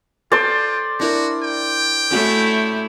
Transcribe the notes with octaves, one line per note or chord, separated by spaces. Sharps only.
F4 A4 C5 D5
D4 E4 F#4 A#4
G5
A3 C#4 E4 F#4 F#5